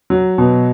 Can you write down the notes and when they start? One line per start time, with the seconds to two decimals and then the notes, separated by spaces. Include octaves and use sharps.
0.10 F#3
0.38 B2